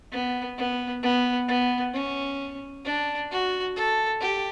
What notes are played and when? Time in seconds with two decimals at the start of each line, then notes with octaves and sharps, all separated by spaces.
0.12 B3
0.58 B3
1.03 B3
1.48 B3
1.94 C#4
2.85 D4
3.31 F#4
3.76 A4
4.21 G4